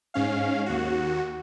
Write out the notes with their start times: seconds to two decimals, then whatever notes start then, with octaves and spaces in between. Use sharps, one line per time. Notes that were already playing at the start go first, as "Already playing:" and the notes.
0.14 G#2 C#4 F5
0.66 D#2 F#4